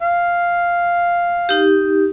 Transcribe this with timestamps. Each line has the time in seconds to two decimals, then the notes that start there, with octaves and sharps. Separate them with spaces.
0.02 F5
1.49 D#4 G4